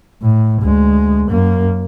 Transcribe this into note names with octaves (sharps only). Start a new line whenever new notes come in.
A2
D2 G#3
F#2 A#3